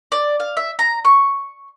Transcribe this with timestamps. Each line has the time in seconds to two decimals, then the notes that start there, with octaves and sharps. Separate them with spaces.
0.12 D5
0.40 F5
0.57 E5
0.79 A#5
1.05 C#6